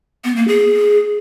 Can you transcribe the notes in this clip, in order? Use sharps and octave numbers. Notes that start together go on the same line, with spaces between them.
B3
A#3
G#4